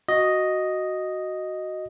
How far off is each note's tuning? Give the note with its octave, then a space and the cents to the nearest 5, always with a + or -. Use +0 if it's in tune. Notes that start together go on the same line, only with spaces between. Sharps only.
F#4 +0 D#5 +0